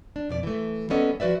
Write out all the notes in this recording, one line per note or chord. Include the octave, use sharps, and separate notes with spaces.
D4
F2 B2 D5
E3 A3
G3 A#3 B3 C#4 A4 D#5
F3 F#4 B4 D5 E5